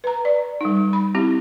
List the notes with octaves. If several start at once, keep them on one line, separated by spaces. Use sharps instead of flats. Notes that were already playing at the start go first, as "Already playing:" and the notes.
B4 A#5
D5
G3 D#4
B5
C4 E4 G4